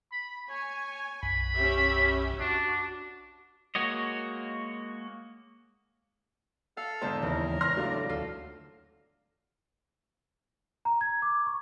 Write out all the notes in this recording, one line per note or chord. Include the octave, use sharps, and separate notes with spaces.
B5
C#5 G#5
B1 F#2 B5
C#4 G4 E5
D4 F#4
G#3 A#3 F#4 C#5 D#5
A4 F5
E2 G#2 D3 C5 A5
D#2 C#3 E3 E4 A#4
C6 F6 A#6
F#3 A3 D4 D5 F5
D2 F4 A4
A#5
G#6
D6
C#6